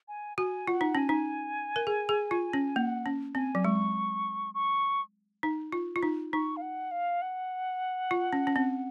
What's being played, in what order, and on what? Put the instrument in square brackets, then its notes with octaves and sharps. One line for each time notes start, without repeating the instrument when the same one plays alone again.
[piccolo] G#5
[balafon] F#4 [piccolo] G#5
[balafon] F4 [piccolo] F#5
[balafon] D#4
[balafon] C#4 [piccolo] G#5
[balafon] D#4
A#4
G#4
G#4
F4
C#4
[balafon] A#3 [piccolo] F#5
[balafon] C#4
[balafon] C4 [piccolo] G#5
[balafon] F#3
[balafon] G#3 [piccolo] C#6
[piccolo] C#6
[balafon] D#4
F4
F4
D#4
[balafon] D#4 [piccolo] C#6
[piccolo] F5
F#5
F5
F#5
[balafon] F4
C#4
C#4
C4